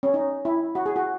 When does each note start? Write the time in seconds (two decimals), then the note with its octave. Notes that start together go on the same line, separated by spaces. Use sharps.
0.03 C#4
0.14 D#4
0.45 E4
0.75 F#4
0.86 G#4
0.96 F#4